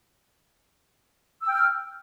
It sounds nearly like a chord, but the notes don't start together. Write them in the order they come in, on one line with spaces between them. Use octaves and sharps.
E6 G5 F6